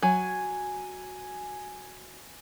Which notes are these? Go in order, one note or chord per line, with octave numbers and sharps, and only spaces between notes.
F#3 G#5